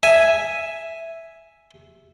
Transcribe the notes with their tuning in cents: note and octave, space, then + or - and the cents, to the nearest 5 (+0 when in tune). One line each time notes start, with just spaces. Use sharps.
E5 +0 G#5 +0